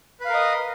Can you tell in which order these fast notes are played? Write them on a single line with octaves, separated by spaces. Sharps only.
B4 F5 A#4 D#5